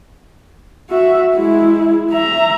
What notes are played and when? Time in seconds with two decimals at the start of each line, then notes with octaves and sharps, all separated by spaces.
0.90 F#4 E5
1.36 G#3 E4
2.11 E5 A#5